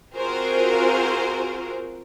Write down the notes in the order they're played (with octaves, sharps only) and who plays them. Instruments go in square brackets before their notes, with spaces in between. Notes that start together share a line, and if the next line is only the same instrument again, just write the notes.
[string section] C4 F4 F#4 G#4 A#4 C5